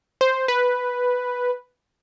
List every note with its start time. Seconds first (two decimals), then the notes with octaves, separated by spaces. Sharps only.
0.21 C5
0.48 B4